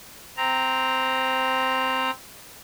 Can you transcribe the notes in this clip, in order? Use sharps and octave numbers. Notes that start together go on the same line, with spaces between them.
C4 A#5